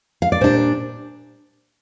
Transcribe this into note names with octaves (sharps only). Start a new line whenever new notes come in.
F5
D5
A#2 G3 D4 C5